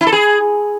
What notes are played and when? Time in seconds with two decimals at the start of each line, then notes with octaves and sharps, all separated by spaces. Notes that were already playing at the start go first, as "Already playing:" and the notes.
0.01 E4
0.07 A4
0.12 G#4